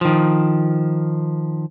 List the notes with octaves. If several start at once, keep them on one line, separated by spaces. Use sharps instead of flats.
D#3 F3